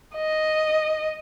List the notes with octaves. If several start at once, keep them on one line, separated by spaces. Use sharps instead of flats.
D#5